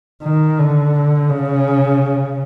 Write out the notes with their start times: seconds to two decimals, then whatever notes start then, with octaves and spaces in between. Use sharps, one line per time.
0.23 D#3
0.59 D3
1.29 C#3